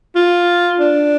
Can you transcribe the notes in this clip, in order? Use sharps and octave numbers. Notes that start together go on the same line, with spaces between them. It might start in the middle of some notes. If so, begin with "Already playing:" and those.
F4
D4